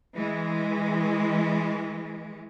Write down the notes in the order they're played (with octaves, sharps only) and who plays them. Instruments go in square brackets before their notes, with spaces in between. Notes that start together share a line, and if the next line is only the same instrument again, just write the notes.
[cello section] E3 G#3